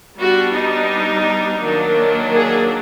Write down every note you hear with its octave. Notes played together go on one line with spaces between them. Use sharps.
G3 B3 D4 F#4
D#4
D#3 F#3 A#3 D4
G#4